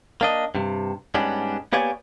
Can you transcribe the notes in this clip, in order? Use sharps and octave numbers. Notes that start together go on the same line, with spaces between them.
A#3 D4 D#5
G2 C3
G#2 G3 B3 C#4 D4
A#3 B3 G4 C#5 D5 G#5